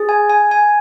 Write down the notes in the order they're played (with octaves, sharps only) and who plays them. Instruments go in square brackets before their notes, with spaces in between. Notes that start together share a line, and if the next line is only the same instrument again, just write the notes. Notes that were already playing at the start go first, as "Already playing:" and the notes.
Already playing: [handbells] G#4
G#5
G#5
G#5